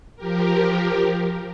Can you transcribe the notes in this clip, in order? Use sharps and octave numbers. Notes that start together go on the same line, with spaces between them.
F3 G4 A#4